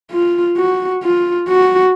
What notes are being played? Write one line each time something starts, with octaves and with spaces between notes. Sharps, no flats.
F4
F#4
F4
F#4